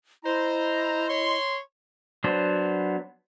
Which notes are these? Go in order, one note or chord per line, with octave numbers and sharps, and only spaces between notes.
E4 C5 D#5 A#5
C#5 C6
F#3 B3 D4 C5